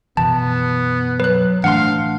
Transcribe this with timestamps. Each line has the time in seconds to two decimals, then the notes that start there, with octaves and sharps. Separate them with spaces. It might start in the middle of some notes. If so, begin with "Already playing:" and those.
0.17 F#2 B2 E3 B3 A5
1.20 F#3 B4 F#6
1.64 A2 E3 A3 D4 F5 F#5 C6